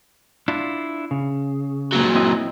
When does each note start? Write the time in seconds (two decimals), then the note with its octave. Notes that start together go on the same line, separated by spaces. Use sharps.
0.48 D4 E4 F4
1.11 C#3
1.93 A#2 F#3
2.15 C4 E4 D#5